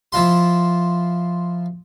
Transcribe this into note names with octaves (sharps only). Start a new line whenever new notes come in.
F3 E4 F4 C6